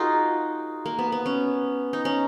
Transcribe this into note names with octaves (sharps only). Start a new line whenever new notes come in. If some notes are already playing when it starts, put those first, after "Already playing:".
Already playing: D#4 F4 F#4 G#4 A#4
A#3
B3
B3
C#4
D#4
C#4